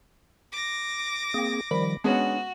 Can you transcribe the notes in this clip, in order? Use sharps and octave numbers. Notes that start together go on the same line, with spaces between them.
D6 A#6
A#3 C4 G#4
D#3 F3 G3 B5
G#3 B3 C#4 D4 F#4